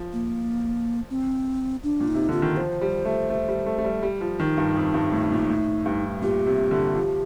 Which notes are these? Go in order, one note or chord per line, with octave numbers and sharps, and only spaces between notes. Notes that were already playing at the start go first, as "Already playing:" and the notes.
Already playing: F3
A#3
C4
D4
A#2
D#4
C3
D3 F4
D#3
F3 C5
G3
A3
A3
G3
A3
A3
G3
G3
F3
D#3 D#4
G2
F2
G2
A2
A#2
A2
G2
A#2 G4
C3
D3
F3